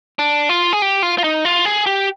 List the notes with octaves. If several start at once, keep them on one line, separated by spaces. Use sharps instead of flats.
D4
F4
G#4
G4
F4
F4
D#4
F4
G#4
G4